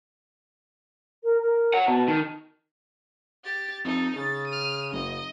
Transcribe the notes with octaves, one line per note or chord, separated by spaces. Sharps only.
A#4
A#4
C#5 F#5
B2 A5
D#3
G4 A6
F2 D#4 A4
C#3 A6
F6 D#7
F#1 D#5